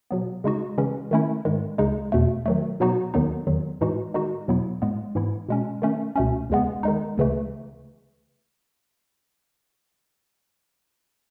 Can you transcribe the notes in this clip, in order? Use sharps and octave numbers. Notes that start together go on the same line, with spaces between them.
B2 F#3 B3
C#3 G#3 D#4 F#4
C#3 E3 G#3 C#4
D#3 A3 C#4 E4
G#2 D#3 G#3
C#2 C#3 G#3 D#4
E2 B2 A3
D#3 F#3 A3
B2 F#3 B3 D#4 F#4
D#2 D#3 F#3 B3 D#4
E2 D#3 F#3
A2 E3 G#3 D#4 F#4
D#3 G#3 D#4 F#4
E2 B2 F#3 B3 E4
A2 G#3 B3
G#2 E3 B3 E4
B2 G#3 C#4
D#3 A3 C#4
C#2 B2 A3 C#4
D#2 C#3 G#3 B3
D#3 G#3 D#4
C#2 C#3 E3 A3